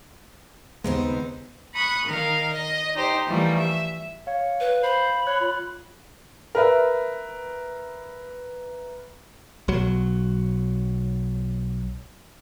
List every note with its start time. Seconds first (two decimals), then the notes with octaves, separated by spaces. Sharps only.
0.84 D#2 C#3 G#3 B3 C4 D#4 C5
1.73 B5 C#6 D#6 F#6
2.05 D#3 A#4 F5
2.52 D#5
2.94 D#4 G4 C5
3.26 E3 F3 G3 A3 A#3
3.57 E5
4.27 C#5 F5
4.60 B4
4.83 C5 B5
5.27 C#5 F#6
5.41 F4
6.55 A#4 B4 E5
9.68 B1 F#3